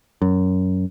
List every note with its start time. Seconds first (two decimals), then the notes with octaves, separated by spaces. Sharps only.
0.22 F#2